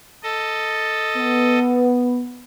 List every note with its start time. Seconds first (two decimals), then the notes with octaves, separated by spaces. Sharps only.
0.23 A4 D#5
1.17 B3